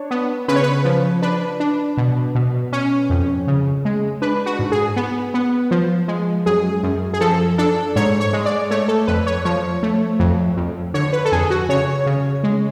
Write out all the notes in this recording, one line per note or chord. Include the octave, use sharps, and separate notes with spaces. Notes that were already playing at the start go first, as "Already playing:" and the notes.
Already playing: D4 C#5
B3
C#3 B4
C#5
B4
F3
D4 B4
D4
B2
B2
C#4
F2
C#3
G#3
D4 B4
F#4
G#2
G#4
B3
B3
F3
G#3
F#2 G#4
F#2
G#4
F3 A4
D4 A4
G#2 C#5
C#5
G#3
D5
A3 C#5
A4
F2 B4
C#5
F3 C#5
A3
F2
F2
D3 C#5
B4
A4
F2 G#4
F#4
C#3 C#5
C#3
G#3